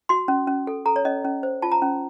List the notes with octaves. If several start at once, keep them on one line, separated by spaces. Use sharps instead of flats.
F#4 C6
C#4
C#4
A4
A4 A#5
C#5
C#4 D#5
C#4
C5
F4 A5
A#5
C#4